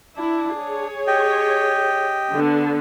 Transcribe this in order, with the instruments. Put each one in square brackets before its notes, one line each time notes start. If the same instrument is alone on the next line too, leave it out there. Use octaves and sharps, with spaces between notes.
[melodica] D4 [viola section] E4
[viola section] G#4 C#5
[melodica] G4 D#5 G5
[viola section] D3 B3